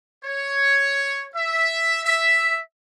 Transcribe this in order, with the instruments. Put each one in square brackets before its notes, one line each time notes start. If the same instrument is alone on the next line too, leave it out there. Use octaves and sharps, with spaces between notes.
[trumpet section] C#5
E5
E5